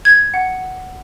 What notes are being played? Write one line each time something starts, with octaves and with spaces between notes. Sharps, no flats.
G#6
F#5